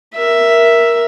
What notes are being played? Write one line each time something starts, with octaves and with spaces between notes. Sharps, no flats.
A#4 E5